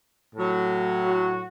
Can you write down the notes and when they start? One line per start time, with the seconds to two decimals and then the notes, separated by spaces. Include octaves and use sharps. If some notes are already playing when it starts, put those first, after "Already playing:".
0.35 A2 F#3
1.05 F#4